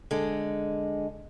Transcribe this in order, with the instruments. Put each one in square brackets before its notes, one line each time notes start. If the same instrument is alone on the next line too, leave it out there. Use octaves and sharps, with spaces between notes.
[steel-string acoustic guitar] D3 G#3